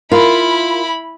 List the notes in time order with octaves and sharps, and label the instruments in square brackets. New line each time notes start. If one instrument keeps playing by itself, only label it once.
[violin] E4 B5 [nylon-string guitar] F4 [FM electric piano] A#4